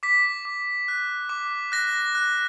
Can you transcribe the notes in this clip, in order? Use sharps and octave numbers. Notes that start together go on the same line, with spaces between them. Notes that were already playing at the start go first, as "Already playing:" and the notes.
D6 B6
D6
F#6
D6
F#6 A#6
F#6